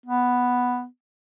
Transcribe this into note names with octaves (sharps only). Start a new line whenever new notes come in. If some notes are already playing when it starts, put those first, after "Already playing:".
B3